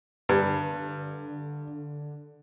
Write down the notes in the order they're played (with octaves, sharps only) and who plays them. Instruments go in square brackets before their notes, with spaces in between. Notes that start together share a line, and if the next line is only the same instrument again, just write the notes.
[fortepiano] G2 [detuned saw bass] D3